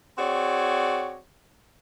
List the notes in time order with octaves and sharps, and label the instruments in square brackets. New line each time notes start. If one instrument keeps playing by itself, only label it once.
[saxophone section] C4 F#4 G#4 C#5 D5